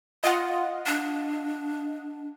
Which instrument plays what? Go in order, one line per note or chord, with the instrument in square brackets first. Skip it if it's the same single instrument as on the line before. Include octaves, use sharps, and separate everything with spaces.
[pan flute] F4 [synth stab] D#5 F5 F#5
[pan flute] D4